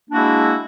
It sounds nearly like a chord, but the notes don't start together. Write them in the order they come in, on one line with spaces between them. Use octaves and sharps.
A#3 D4 F#4 E4 G#3